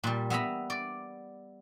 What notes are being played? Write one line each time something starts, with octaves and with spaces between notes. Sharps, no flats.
A#2 G3
B3 E5 A#5 B5
D5